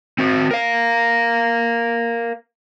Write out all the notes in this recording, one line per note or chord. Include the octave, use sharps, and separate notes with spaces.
C4 F#4
A#4 F5